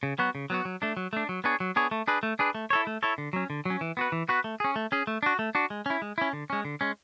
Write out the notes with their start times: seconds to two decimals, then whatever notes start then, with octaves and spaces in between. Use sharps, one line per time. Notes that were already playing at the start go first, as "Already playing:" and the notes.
0.03 C#3
0.18 F#3 B3 F#4
0.35 C#3
0.50 F#3 B3 F#4
0.65 F#3
0.82 A3 D4
0.97 F#3
1.13 A3 D4
1.29 F#3
1.44 B3 D4 G#4 C#5
1.60 F#3
1.76 B3 D4 G#4 C#5
1.91 A3
2.08 D4 G#4 B4
2.23 A3
2.39 D4 G#4 B4
2.55 A3
2.70 E4 A4 C#5
2.87 A3
3.03 E4 A4 C#5
3.18 D3
3.33 F#3 C#4
3.50 D3
3.65 F#3 C#4
3.81 E3
3.97 B3 F#4 B4
4.12 E3
4.28 B3 F#4 B4
4.44 A3
4.60 C#4 G#4
4.76 A3
4.92 C#4 G#4
5.07 A3
5.23 D4 F#4
5.39 A3
5.55 D4 F#4
5.70 G#3
5.86 C#4 E4
6.02 G#3
6.18 C#4 E4
6.33 D3
6.50 G#3 C#4
6.65 D3
6.81 G#3 C#4